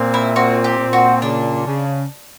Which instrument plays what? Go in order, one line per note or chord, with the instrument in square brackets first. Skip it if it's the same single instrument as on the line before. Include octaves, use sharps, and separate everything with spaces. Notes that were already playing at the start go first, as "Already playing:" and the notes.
Already playing: [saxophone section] A#2 C4
[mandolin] E4
[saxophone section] C4 [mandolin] F#4
[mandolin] G4
[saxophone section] A#2
[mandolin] F#4
[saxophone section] C#3 [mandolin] D4
[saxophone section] C#3